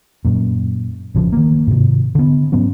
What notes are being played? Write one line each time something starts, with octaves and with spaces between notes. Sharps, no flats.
F#2 A#2
A1 C#3 F3
D#3 A#3
G#2 C3
D3 B3
G#2 F#3 B3 C#4